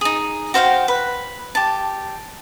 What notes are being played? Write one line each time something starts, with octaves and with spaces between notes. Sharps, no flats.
D#4 G#4
F#4 C5 F5 G5
B4
G4 A5